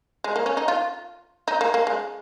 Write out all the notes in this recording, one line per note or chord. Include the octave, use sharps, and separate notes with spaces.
G#3
A#3
C#4
D#4
F4
D#4
A#3
A#3
G#3